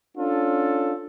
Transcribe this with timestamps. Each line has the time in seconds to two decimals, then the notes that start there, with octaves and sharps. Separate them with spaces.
0.17 C#4 D4 F4 A4